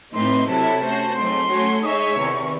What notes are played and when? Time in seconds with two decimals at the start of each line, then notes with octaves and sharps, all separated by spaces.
0.13 A2 E3 A3 C4 D#4 C6
0.47 C3 F#3 C4 E4 A4 A5
0.81 A3 C#4 F#4 C5
1.15 G#2 F#3 A3 C4 C6
1.49 F#3 A3 C#4 F#4 C#5
1.83 G#3 D#4 G#4 C#5 E5 C#6 D#6
2.15 E2 C3 D#3